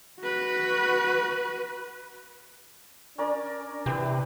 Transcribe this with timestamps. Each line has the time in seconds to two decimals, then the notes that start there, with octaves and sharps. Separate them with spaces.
0.21 F#4 B4
3.18 C#4 D4 A#4 D5
3.86 C3 E3 G4 B4